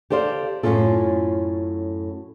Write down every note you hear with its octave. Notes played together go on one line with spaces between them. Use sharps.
G4 A4 C5 D5 F5
F#2 A2 C#4 F4 A4